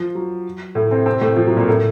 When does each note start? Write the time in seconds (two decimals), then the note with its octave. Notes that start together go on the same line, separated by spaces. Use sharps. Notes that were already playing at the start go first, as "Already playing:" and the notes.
Already playing: F3
0.15 F#3
0.75 A2 A3
0.91 C3 C4
1.06 C3 C4
1.21 A2 A3
1.36 F3
1.47 F#3
1.57 A#2 A#3
1.67 A2 A3